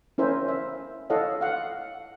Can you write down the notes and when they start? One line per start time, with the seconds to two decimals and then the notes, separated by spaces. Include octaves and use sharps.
0.18 C#4 E4 A#4 C5 E5 G#5
0.48 E5
1.10 E4 A4 C#5 D#5 F5 F#5
1.41 F5 F#5